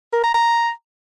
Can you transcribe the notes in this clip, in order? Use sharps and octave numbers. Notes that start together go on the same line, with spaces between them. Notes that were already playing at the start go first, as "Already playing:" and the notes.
A#4
A#5
A#5